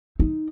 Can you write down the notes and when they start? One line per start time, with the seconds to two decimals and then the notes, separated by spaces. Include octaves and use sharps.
0.19 D#4